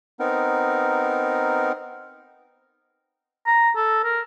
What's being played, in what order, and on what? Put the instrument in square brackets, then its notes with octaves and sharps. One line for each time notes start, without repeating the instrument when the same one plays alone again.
[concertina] B3 C4 D#4 A#4
[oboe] A#5
A4
A#4